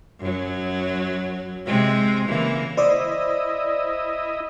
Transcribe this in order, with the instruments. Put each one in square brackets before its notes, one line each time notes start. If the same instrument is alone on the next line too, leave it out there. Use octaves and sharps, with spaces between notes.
[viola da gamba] F#2 F#3
C3 G#3 C4
C#3 E3 A#3
[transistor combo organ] E4 D#5 [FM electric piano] C5 D5